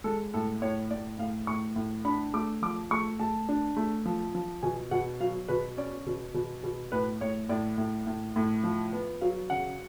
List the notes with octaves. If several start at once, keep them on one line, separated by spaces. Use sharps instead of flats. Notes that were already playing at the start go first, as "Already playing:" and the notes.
G#3 A4
A2 A4
A2 C#5
A2 D5
A2 F5
A2 C#6
A2
D4 B5
A3 D6
F3 D6
A3 C#6
A3 A5
D4
A3
F3
F3
B2 G#5
B2 F#5
F#3 F5
B2 B4
C#4 D5
B2
B2
B2
A2 B4
A2 C#5
A2 D5
A2
A2
A2
F3
B3
F#3 F5
C#3 F#5